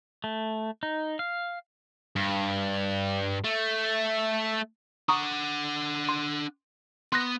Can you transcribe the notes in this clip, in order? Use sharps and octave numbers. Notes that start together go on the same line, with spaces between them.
A3
D#4
F5
G2
A3
D4 F#5 A#5 C#6 D#6
C6
B3 C6 F#6 A#6